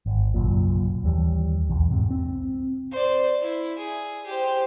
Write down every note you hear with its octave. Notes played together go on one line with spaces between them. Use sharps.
G#1
F#1 B1 F#2 A#2
D#2 E3 G3
B1 E2
G#2 C3
C4
C5 D5
E4
G#4
G4 C5